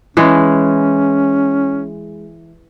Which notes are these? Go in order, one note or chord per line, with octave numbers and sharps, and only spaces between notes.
E3 G#3 C#4